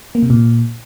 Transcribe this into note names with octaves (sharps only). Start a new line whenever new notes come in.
A#3
C3
A#2